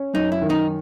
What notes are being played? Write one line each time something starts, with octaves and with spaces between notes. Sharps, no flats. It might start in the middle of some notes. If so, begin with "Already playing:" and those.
Already playing: C#4
F#2 D#4
E4
D#3
D#4